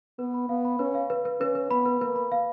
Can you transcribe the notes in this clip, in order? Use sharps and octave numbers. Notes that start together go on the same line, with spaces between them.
B3 B4
B5
B3 F5
B5
C#4 B4
F5
B4
B4
C#4 B4
B4
B3 B5
B4
A#3 B4
B5
F5